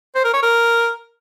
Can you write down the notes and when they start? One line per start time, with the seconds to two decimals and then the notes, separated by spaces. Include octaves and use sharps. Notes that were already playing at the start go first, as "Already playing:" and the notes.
0.15 C5
0.24 A#4
0.33 C#5
0.43 A#4